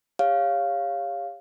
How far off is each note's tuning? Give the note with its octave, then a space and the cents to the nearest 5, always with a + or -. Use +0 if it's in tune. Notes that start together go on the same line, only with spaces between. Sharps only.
G4 +40 C#5 +5 F5 +0